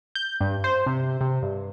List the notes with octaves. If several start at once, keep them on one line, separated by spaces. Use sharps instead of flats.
G6
G2
C5
C3
C3
G2